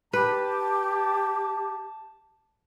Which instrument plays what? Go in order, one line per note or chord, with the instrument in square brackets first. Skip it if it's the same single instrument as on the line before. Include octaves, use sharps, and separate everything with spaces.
[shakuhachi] G4 [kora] B4 [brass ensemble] A5